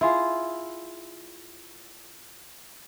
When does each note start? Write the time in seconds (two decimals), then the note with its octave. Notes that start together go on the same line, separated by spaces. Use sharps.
0.01 E4 F4 G#4